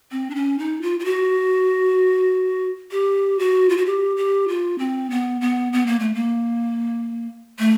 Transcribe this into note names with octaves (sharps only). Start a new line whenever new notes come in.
C4
D4
C#4
D#4
F4
F4
F#4
G4
F#4
F4
F#4
G4
G4
F4
C4
B3
B3
B3
A#3
A3
A#3
A3